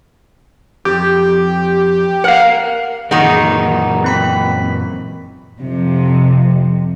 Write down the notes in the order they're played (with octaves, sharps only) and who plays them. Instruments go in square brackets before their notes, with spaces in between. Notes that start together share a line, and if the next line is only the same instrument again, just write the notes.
[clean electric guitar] F2 [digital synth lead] G4
[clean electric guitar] A#4 F5 [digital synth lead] F#5
[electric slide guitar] F#2 A#2 E3 [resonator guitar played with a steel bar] D#3 D#4 [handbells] G#4 F#5 A#5
[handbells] C4 B5 B6
[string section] F2 C3